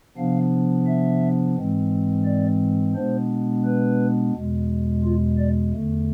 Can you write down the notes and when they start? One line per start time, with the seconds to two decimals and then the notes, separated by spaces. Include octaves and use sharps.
0.17 C3 F3 B3 D4 F5
0.87 E5
1.56 G#2 E3 G#3 C4
2.26 D5
2.95 B2 G#3 B3 D4 C5
3.65 B4
4.34 E2 B2 G#3
5.04 F4
5.38 D5
5.73 E2 D3 A3